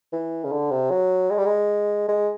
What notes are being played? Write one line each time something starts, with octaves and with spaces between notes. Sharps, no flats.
E3
C#3
D3
C3
F#3
G#3
G3
G#3
G#3